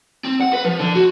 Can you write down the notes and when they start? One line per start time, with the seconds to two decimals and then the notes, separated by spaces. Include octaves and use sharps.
0.25 C4
0.41 F#5
0.53 B4
0.65 F3
0.80 D3
0.96 F#4